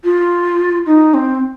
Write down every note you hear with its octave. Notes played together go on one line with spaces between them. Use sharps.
F4
D#4
C4